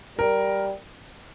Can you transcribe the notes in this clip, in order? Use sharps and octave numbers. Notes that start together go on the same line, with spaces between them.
G3 A#4